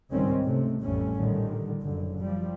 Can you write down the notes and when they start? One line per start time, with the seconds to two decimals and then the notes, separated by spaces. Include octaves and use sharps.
0.12 C#2 G#2 D#3 G3 C4 C#4
0.43 C3 A3
0.82 A1 F2 A2 G3 A3 C#4
1.18 A#2 D3 D#3 G3
1.82 F#1 D3
2.19 F3 G3